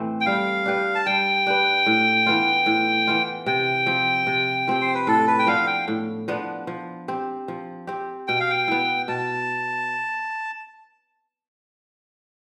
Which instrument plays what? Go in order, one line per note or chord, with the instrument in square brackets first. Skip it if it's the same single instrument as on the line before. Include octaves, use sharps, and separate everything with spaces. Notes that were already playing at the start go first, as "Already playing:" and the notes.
Already playing: [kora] A2 E3 A3 C4
[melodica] G5
[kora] G3 [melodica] F5
[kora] D4 G4 B4
[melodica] A5
[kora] G3 [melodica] G5
[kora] D4 G4 B4
A2
E3 B3 F4
A2
E3 B3 F4
[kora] C3 [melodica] G5
[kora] F3 C4 G4
C3
F3 C4 G4
[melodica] C5
B4
[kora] A2 [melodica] A4
[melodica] B4
G5
[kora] F3 B3 D4 [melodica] F5
[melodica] G5
[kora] A2
F3 B3 D4
F3
C4 G4
F3
C4 G4
[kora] B2 [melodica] G5
[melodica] F5
G5
[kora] B3 E4
[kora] B2 [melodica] A5